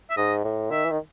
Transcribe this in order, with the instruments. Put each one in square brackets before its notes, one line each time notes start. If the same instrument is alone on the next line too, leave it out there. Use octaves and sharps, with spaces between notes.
[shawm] E5
[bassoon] G#2 [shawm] D#5
[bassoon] A2
[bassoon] D#3 [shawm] E5
[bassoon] E3
D#3